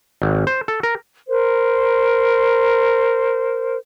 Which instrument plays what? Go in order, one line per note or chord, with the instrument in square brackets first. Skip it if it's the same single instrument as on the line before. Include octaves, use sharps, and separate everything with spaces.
[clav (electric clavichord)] G#1
C5
A4
A#4
[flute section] A#4 C5